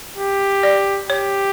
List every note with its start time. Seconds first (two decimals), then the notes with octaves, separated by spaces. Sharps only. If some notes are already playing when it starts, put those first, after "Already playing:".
0.17 G4
0.63 D5
1.09 G4 C#5